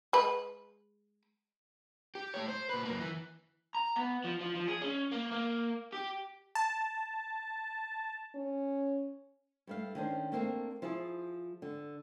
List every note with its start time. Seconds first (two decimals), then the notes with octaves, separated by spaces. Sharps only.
0.13 G#3 B4
2.15 G4
2.34 A3 C#5
2.48 C5
2.70 A#2 B4
2.85 F#2 A#3
3.00 E3
3.75 A#5
3.96 B3
4.24 F3
4.41 F3
4.55 F3
4.68 G#4
4.82 C#4
5.12 A#3
5.32 A#3
5.92 G4
6.55 A5
8.35 C#4
9.67 G2 A3 F5
9.95 D#3 C#4 D4 C5
10.32 A3 A#3 C4 D4 A#4
10.82 F3 E4 F4 G#4
11.62 D3